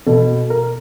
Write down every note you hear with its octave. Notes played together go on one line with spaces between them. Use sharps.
B2 A4
A#4